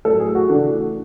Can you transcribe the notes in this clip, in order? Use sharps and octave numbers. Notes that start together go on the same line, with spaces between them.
A2 F#3 A3 A4
G#4
F#4
C#3 E3 A3 D4